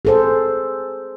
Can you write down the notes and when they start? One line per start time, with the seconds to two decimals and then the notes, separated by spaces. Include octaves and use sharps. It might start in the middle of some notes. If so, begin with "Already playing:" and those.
0.05 G#4 A4 C5